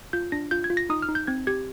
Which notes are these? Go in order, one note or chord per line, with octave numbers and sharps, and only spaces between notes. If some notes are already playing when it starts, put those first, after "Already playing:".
F4 G6
D4 A#6
F4 G6
G#6
F4
A#6
D#4 D#6
F6
D#4
G6
C4 G#6
G4 G#6